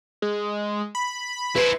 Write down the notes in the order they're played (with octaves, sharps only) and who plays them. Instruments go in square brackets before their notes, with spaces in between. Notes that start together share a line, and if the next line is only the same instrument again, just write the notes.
[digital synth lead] G#3
B5
[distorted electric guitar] E4 C5 [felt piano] B4